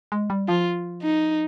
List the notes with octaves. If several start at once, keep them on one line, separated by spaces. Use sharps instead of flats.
G#3
G3
F3 F4
D#4